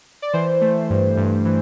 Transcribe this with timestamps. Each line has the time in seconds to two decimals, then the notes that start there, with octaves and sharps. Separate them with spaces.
0.22 D5
0.33 E3 C5
0.61 A3
0.90 G2
1.17 G2
1.46 E3